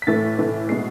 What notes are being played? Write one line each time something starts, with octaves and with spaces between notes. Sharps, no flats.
B6
A2 E3 A3 A6
A2 E3 A3
B2 G#3 C7